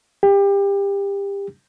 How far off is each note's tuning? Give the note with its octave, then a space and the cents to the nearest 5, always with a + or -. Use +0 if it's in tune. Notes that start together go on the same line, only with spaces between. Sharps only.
G4 +25